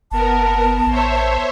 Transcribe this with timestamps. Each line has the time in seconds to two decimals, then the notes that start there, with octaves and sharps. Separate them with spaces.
0.11 F#1 B3 A#4 A5
0.87 A1 C5 C#5 E5